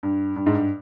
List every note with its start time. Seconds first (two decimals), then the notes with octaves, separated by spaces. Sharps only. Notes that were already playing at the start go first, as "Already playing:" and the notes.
0.03 G2
0.36 G2
0.46 G#2
0.53 G2